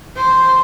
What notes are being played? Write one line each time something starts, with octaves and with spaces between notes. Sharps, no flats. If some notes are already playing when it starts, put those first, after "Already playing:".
C5